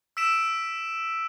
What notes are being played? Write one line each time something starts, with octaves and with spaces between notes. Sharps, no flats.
E6 B6 D7 E7